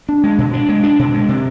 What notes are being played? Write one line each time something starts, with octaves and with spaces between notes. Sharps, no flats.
D4
G#3
B2
D4
G#3
D4
B2
G#3
C3